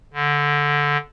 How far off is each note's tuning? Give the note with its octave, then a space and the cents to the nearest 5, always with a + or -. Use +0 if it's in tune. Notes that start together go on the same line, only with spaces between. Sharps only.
D3 -10